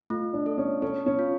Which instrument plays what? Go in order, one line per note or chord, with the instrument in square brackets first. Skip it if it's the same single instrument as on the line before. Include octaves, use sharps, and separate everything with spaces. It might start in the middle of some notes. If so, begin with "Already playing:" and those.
[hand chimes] A3 [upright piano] F4
[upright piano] D4
[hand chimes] A4
[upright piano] C#4
[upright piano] C#4 [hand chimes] A4
[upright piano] C#4
[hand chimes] F4